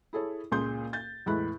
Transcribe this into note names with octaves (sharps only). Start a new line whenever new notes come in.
E4 G#4 A4 C#5
C#2 A#2 G#4 C6 G6
G6 A6
E2 A2 G#3 E4 B5 F#6